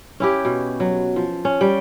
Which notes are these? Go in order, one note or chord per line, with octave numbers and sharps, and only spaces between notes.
C#4 E4 G4
B2
F#3
F3
C#4
G3 G5